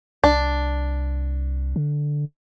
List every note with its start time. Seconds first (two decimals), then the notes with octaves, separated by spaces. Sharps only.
0.24 C2 D4
1.76 D3